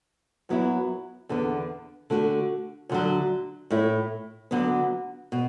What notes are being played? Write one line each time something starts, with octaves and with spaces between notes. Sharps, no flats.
F#2 F#3 B3 E4
E2 D3 B3
D3 A3 F#4
D2 D3 F#3
A2 A3 E4
D2 D3 F#3 B3
B2